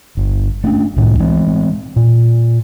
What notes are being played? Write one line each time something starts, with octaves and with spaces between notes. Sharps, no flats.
G1
A3 C#4 D4
C2 A2 D#3 G3
E3 G#3 C4
A#2